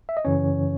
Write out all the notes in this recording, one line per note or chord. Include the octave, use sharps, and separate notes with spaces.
E5
D#5
F#2 C#3 E3 C#4 C#5